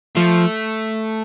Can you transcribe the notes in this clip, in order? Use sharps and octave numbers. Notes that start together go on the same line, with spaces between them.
F3 A3